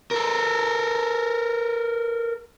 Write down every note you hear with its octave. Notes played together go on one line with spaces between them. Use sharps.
A4 A#4